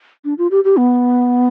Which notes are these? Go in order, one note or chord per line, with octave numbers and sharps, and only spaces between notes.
D4
F4
G4
G4
B3